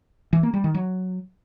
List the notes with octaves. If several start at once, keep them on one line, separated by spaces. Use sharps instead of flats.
E3
A#3
G3
D#3
F#3